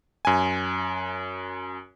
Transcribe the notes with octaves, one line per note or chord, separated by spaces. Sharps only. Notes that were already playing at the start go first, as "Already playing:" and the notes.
F#2 G#5